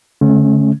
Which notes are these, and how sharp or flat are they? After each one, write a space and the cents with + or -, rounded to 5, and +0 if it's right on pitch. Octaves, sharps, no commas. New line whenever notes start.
D3 -35 A3 -35 C#4 -15